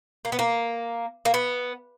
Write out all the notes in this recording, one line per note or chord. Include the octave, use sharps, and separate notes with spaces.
A#3
B3
A#3
A#3
B3